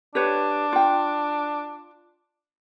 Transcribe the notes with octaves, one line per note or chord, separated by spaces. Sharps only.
D4 G4 B4 C#5
F4 G5